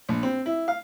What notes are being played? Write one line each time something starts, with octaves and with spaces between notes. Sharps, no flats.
A#1
C4
E4
F5